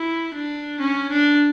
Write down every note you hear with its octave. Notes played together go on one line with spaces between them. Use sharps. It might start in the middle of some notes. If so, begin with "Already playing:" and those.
Already playing: E4
D4
C#4
D4